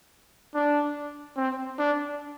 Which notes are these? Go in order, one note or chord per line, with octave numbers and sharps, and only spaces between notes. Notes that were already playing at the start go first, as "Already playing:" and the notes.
D4
C4
D4